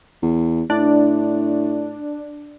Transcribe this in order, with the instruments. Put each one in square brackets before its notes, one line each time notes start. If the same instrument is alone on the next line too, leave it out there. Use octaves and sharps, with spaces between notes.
[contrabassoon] E2
[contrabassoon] A2 [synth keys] D4